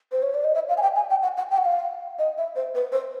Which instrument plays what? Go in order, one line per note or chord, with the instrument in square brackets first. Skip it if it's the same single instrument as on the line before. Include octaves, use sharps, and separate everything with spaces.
[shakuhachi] C5
C#5
D5
D#5
E5
F5
G#5
G5
G#5
G5
F#5
F#5
G5
F#5
F5
D#5
E5
C5
B4
C5